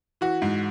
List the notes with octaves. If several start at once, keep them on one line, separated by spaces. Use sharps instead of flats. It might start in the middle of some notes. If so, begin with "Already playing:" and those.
E3 F#4
G#2